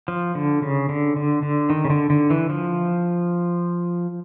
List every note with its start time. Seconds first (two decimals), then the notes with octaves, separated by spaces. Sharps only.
0.08 F3
0.35 D3
0.62 C#3
0.89 D3
1.16 D3
1.43 D3
1.70 D#3
1.85 C#3
1.90 D3
2.10 D3
2.30 E3
2.50 F3